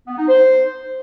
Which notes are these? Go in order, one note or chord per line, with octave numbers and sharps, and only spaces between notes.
B3
D#4
C5